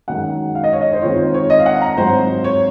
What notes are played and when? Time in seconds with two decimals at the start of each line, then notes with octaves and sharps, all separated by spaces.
0.08 F#2 D#3 G#3 F#5
0.55 F5
0.64 D#5
0.73 C#5
0.81 D#5
0.93 C5
1.02 D#3 G#3 C4 F4 C#5
1.18 C5
1.34 C#5
1.50 D#5
1.60 F5
1.66 F#5
1.81 A#5
1.97 G#2 F#3 C4 C5
2.44 C#5